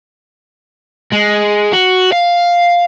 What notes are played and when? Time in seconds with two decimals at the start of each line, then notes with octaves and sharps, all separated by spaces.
1.12 G#3
1.73 F#4
2.13 F5